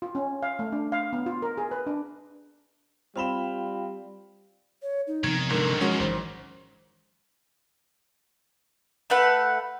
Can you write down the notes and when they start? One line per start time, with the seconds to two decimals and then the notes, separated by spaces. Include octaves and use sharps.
0.02 F4
0.15 C#4
0.43 F5
0.59 A3
0.72 D4
0.92 F5
1.13 B3
1.26 F4
1.42 A#4
1.58 G#4
1.71 B4
1.87 D4
3.16 G3 C4 F4 F5 G5 B5 E7
4.82 C#5
5.07 D#4
5.24 C3 D#3 F3 B3 G#6
5.50 G#2 D3 D#3 F#3 A#4
5.81 F3 G#3 C#4 F#4
6.00 G#1 G#2 E3 C5
9.10 A3 B4 F#5